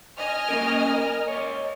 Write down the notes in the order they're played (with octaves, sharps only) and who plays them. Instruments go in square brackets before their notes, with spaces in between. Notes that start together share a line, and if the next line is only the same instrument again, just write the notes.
[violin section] D#5 G#5 F6
[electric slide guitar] A#3 C#4 A#4
A#4
C#5 D#5